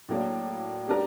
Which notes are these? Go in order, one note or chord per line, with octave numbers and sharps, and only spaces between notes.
A2 F#3 A#3 D4
G3 B3 D4 G4 A#4